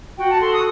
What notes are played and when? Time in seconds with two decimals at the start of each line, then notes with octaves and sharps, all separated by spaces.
0.18 F#4 G5
0.29 A5
0.41 A4 C6
0.52 D#6